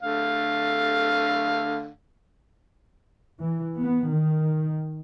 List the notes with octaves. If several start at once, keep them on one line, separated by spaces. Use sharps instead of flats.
D3 A3 F5
E3
B3
D#3